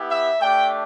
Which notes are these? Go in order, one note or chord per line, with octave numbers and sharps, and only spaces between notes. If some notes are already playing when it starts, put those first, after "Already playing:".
Already playing: B3 E4 G4
E5
A3 D4 G4 G5